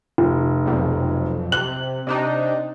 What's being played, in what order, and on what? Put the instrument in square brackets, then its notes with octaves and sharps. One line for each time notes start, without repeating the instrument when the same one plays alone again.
[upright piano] F1
[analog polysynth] B1 F2
[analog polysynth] C3 [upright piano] F#6 F#7
[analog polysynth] C3 D4 D#4